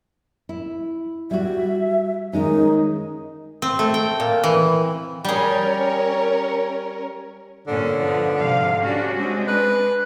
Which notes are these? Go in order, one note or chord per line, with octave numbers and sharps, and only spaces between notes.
E4
G3 F#4 E5
D#3 G#3 C#4 D#4
C4
A3
G5
A#2
E3
G3 C#4 G#4 A#4 C#5
G2 A#2 D3 C#4
F3 B3
G#2 C3 F5
G3 C#4 D4 F#4
G#3 C4 D4
B4